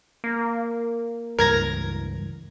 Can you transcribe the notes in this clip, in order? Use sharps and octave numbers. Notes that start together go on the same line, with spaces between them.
A#3
C#2 G2 E3 A#4 G#6 A#6